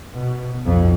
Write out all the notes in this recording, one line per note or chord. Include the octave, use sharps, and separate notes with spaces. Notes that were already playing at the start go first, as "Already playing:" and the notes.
B2
B1 F2